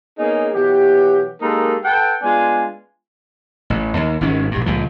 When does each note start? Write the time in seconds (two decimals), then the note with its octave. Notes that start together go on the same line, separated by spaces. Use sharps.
0.19 A#3 B3 C#4 D#4 G#4
0.54 B2 E3 F#3 G4
1.42 G#3 A#3 D#4 G4 A4 A#4
1.84 A4 B4 F#5 G5
2.23 G#3 B3 D4 F4 G#5
3.70 A1
3.97 D#2
4.21 G#1 G#2 D#3 C#4
4.51 A#1 G2
4.66 C#2 A#2 F3